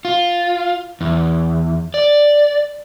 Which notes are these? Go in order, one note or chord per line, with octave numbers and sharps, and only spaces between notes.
F4
E2
D5